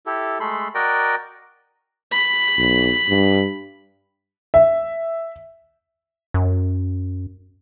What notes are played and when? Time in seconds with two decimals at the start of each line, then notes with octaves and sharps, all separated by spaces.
0.06 E4 G4 A4
0.40 G#3 A3 A4 B5 C6
0.75 F#4 A#4 D5 D#5 G5
2.12 B5
2.58 B1
3.09 G2
4.54 E5
6.34 F#2